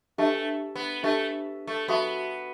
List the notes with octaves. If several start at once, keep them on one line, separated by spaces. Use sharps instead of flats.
A3 D4 G4 B4 E5 A5
B3
A3 D4 G4 B4 E5 A5
A3
B3 F#4 A4 E5 A5 C#6